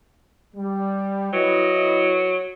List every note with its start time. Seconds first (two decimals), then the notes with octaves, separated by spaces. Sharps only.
0.55 G3
1.33 F#3 E4 B4 D#5